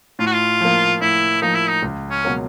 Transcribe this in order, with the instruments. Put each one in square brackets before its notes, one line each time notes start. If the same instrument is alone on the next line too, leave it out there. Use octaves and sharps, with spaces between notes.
[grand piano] A2 [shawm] F4
[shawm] F#4
F4
[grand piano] F3 A#3
[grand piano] A2 [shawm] E4
[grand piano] F3 A#3 [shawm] D#4
[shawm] E4
D#4
[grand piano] C#2
[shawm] C#4
[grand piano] B2 F#3 A#3